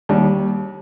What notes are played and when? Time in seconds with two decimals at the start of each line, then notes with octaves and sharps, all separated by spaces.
0.09 D#2 G3